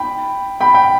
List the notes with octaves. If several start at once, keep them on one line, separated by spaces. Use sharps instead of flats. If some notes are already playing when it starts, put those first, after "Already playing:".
Already playing: G5 B5
G5 B5
G5 B5